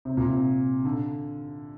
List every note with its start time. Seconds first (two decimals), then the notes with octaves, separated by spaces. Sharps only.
0.05 C3
0.17 A#2
0.28 C3
0.85 D3